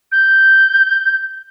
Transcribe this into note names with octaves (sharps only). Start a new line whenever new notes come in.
G6